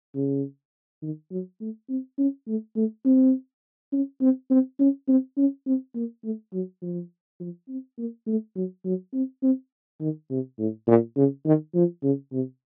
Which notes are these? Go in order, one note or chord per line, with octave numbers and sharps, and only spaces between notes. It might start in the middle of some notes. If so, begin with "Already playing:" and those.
C#3
D#3
F#3
A3
C4
C#4
A3
A3
C4
C#4
C4
C4
C#4
C4
C#4
C4
A#3
A3
F#3
F3
F3
C4
A#3
A3
F#3
F#3
C4
C4
D#3
C3
A2
A#2
C#3
D#3
F3
C#3
C3